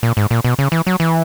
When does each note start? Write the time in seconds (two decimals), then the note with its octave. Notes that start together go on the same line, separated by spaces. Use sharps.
0.03 A#2
0.17 G#2
0.31 A#2
0.44 B2
0.59 C#3
0.72 E3
0.87 F#3
1.00 E3